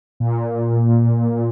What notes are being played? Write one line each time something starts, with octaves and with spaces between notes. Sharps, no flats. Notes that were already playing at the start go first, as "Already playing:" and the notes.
A#2